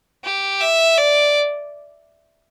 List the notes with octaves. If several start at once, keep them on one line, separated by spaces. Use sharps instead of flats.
G4
E5
D5